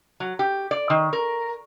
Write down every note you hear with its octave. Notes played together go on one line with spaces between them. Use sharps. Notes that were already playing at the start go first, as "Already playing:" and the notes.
F#3
G4
D5
D#3
A#4